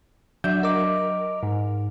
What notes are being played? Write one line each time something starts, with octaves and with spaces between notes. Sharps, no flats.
F#3 D4 E5 G6
A#4 D#5 D6
G#2